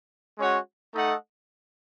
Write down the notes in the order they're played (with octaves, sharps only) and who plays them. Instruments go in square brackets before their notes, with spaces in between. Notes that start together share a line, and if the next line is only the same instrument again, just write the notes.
[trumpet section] G#3 C#4 F#4 C#5 F#5
A3 D#4 A4 D#5 F#5